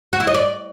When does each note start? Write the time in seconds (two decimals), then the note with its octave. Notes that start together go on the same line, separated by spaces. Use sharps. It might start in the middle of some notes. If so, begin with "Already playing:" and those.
0.13 F#4
0.20 E4
0.27 D#5
0.34 D5